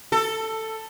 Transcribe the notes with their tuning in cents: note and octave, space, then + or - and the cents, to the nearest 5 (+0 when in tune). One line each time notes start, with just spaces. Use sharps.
A4 +10